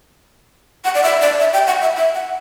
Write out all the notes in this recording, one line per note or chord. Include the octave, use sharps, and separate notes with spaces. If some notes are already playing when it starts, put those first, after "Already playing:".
F#5
D5
E5
D5
E5
G5
F#5
E5
E5
F#5